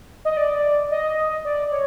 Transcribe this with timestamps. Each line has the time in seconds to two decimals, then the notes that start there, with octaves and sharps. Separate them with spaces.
0.25 D#5
0.37 D5
0.91 D#5
1.45 D5
1.72 C#5